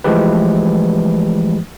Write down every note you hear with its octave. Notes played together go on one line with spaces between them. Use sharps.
E3 F3 G#3 A3 G4 B4